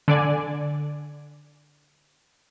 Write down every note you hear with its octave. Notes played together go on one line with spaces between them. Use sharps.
D3 D5 G#5